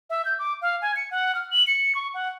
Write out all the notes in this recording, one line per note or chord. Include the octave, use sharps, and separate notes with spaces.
E5
G6
D6
F5
G#5
C#7
F#5
F6
F#7
C#7
C#6
F#5